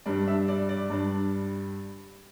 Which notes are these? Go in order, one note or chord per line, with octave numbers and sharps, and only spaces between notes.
G2 G3 D4
E5
D5
D5
G2 G3 D4